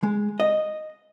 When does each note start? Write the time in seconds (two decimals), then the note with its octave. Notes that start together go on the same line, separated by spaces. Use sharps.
0.03 G#3
0.40 D#5